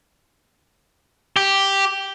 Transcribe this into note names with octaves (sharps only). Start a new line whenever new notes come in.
G4